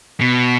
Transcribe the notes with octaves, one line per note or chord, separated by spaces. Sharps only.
B2